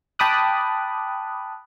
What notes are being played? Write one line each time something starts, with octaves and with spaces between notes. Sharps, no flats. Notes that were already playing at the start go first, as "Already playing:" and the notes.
G5 A5 B5 D6 D#6 F#6